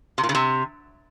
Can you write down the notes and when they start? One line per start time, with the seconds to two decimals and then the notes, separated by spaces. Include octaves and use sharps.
0.18 C3
0.23 A#2
0.29 C#3
0.35 C3